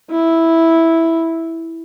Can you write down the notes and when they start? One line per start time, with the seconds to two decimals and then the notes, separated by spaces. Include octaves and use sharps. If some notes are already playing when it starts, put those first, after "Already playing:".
0.11 E4